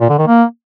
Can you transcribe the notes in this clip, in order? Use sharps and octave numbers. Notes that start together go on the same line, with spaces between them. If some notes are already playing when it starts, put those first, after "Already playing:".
A#2
D3
D#3
A#3